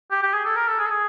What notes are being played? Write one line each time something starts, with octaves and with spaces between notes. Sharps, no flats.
G4
G4
G#4
A4
A#4
A4
G#4
A4
G#4